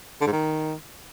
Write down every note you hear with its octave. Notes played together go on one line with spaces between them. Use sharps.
D3
G#2
D#3